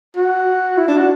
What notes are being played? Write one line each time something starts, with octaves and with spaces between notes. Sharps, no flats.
F#4
E4
D4
F#4